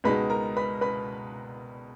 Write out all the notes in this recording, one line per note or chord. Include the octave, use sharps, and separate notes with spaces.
C#2 B2 G#3 B3 D#4 B4 B5
A#4 A#5
B4 B5
B4 B5